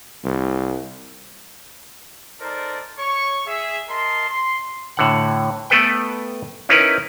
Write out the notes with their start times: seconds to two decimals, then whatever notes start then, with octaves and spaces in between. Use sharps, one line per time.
0.24 C2
2.40 D#4 A4 A#4 C5 D5
2.98 C#5 C#6
3.46 G#4 E5
3.88 A#4 D#5 A5 C6
4.28 C6
4.97 A2 D3 F#5
5.70 A3 B3 A4 B4 G5
6.69 C#4 D#4 E4 A#4 B4